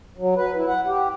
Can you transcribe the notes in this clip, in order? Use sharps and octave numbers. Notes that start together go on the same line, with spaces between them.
F#3
B4
E4
F#5
G4